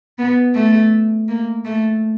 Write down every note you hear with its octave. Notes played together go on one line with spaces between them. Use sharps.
B3
A3
A#3
A3